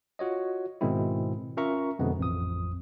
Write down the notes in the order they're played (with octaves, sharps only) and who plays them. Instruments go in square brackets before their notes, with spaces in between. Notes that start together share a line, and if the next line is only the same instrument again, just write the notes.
[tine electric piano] F4 F#4 C#5 D#5
G#2 B2 D#3 G#3 C4 E4
C#4 F4 A#4 E5 A#5 C#6
F2 B2 D3 G#3 B3
A1 F2 D#6